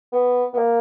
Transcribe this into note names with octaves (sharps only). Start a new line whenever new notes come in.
B3
B3
A#3